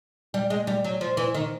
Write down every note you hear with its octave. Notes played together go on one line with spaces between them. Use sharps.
G3
G#3
G3
F#3
F3
E3
D#3